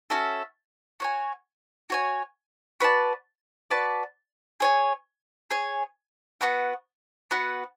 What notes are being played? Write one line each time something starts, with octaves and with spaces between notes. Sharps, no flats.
C#4 F#4 A4 E5
F#4 C#5 G#5
F#4 C#5 G#5
F#4 B4 D5 A5
F#4 B4 D5 A5
G#4 C#5 G#5
G#4 C#5 G#5
B3 F#4 B4 F#5
B3 F#4 B4 F#5